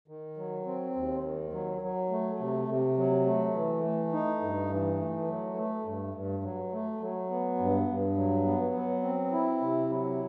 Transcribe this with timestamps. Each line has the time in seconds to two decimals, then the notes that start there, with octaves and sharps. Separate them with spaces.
0.08 D#3
0.37 F#3
0.66 C4
0.96 D#2
1.24 D#3
1.53 F#3
1.81 F#3
2.10 A3
2.39 C3
2.68 C3
2.97 F#3
3.26 A3
3.55 E3
3.84 A3
4.13 D#4
4.41 G2
4.71 E3
4.99 A3
5.28 F#3
5.57 A3
5.85 G2
6.14 G2
6.43 F#3
6.72 A3
7.01 F#3
7.30 B3
7.59 G2
7.88 G2
8.17 F#3
8.45 B3
8.74 F#3
9.03 C4
9.32 E4
9.61 C3
9.90 F#3